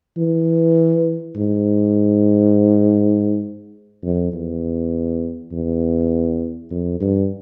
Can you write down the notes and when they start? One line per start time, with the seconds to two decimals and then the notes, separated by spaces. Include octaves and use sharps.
0.17 E3
1.36 G#2
4.03 F2
4.33 E2
5.52 E2
6.70 F2
7.00 G2